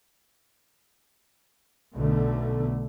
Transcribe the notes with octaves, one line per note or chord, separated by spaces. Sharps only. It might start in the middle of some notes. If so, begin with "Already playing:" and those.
B1 B2 D3 A3